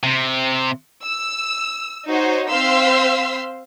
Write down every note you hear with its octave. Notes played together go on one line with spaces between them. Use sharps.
C3
E6
D#4 F#4 C5 C#5
C4 C5 F5 C6 E6 B6